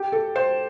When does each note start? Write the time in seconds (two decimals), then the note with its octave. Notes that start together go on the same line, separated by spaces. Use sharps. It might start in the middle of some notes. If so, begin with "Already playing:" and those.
Already playing: G4
0.12 A4
0.36 C5